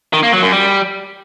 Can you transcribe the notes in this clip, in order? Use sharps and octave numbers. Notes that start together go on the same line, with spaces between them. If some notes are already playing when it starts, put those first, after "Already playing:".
D#3
A#3
F#3
F#2
G3